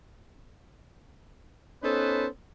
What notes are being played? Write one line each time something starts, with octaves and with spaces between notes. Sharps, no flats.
B3 C#4 D#4 A4 B4 C5